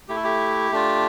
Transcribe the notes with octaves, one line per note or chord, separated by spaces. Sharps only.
A3 E4 G4
A4
G4
A3 D4 F4